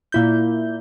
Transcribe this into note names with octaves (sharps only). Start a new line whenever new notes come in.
A#2 E4 G6